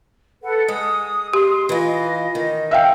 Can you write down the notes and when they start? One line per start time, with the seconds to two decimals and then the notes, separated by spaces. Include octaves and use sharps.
0.43 A4 B4 F#5
0.68 G#3 D#6
1.33 G4 C6
1.69 E3 F4 D#5
2.35 D#3
2.71 E5 F5 G5